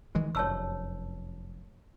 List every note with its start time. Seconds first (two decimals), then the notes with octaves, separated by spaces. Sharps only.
0.15 D#3 E3 G#3
0.35 F1 F#2 C#5 A5 E6